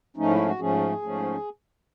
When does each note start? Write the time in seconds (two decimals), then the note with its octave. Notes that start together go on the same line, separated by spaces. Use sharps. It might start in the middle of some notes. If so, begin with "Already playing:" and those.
0.16 G#2 F3 A3 C#4 D#4
0.31 E4
0.45 F#4
0.59 G#2 F3 A3 C#4 G#4
1.02 G#2 F3 A3 C#4